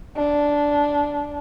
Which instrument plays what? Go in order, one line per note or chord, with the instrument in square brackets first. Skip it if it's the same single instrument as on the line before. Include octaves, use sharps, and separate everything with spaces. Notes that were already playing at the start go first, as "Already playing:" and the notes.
[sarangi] D4